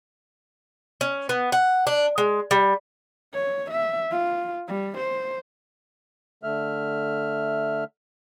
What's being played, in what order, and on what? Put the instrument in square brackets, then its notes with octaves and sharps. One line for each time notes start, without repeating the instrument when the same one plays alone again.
[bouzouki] C#4
B3
F#5
D4
G#3
G3
[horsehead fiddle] C#5
E5
F4
G3
C5
[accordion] D3 A3 E5 F6